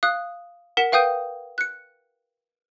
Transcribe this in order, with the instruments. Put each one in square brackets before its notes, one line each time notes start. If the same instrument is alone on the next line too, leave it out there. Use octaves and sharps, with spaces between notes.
[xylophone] F5 D#6 F#6
A#4 F#5 B6 E7
B4 F5 G5 D#6 G6 D#7
F#6 C#7